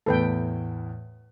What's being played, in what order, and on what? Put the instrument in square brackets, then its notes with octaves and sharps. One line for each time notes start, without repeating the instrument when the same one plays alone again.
[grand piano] E2 A2 [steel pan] A4 B4 G5